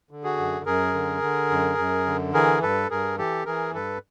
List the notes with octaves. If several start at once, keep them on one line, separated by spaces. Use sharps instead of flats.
D3
F#4 G#4
F#2
F#2 G#4 A#4
D3
D3
F#2
F#2
D3
E3 G#4 A#4
G2 A4 B4
G2 G#4 A#4
E3 G4 A4
E3 G#4 A#4
G2 A4 B4